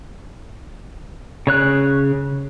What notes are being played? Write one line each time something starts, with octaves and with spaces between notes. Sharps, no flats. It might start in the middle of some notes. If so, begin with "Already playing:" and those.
C#3 C#5 F#6